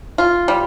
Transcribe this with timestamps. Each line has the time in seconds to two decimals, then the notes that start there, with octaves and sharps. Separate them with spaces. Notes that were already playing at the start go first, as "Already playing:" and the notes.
0.18 F4
0.48 G3